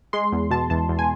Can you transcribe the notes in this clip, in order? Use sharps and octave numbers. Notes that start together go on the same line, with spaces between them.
G#3 C6
E2
B2 A5
E2 A5
E2
G#5